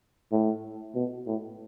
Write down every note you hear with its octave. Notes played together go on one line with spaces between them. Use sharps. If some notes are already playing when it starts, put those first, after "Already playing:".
A2
B2
A2